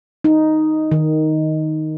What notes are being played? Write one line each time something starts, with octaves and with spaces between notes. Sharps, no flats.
D#4
D#3